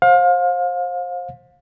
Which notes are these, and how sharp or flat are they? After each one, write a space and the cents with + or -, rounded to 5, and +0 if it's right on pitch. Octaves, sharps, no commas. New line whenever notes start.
C5 +25 F5 +30